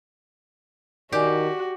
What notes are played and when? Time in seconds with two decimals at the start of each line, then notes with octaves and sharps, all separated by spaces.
1.12 D#3 F#4 G4 D5 G#5